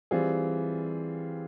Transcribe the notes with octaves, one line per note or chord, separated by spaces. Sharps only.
E3 G3 C4 F4 G#4